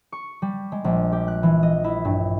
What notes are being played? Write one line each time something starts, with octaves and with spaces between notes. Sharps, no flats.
C#6
G3
G#3
A#1
G4
F#6
E3
D#5
E4
G2